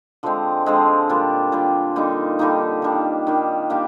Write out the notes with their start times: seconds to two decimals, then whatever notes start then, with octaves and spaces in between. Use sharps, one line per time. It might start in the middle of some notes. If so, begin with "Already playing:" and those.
0.23 D3 F3 G#3 C4
0.66 D3 F3 G#3 C4
1.09 A#2 G3 D4
1.52 A#2 G3 D4
1.96 D3 G3 A#3 D#4
2.39 D3 G3 A#3 D#4
2.82 D#3 G3 D4
3.27 D#3 G3 D4
3.70 G3 A#3 D4 G4